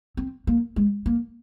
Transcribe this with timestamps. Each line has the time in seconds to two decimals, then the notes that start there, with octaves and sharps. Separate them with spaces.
0.17 C4
0.47 A#3
0.76 G#3
1.06 A#3